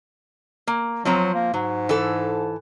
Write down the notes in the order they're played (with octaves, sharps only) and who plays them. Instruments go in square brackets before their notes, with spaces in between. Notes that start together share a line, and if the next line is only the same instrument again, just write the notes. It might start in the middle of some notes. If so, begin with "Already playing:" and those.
[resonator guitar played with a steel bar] A#3
[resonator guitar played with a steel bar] F3 C4 A#5 [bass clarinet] F#3
[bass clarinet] A#3
[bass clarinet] G#2 [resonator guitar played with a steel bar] F#3
[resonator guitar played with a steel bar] E3 A4